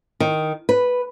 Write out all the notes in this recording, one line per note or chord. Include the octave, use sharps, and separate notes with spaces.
D#3
B4